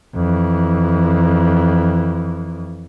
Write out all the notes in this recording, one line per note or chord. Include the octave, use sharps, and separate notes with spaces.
F2 E3